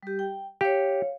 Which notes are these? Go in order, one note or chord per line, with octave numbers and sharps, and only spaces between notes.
G3 G4
G5
G4 C#5 F5